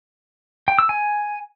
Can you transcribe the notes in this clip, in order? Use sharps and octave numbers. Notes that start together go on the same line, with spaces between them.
G5
E6
G#5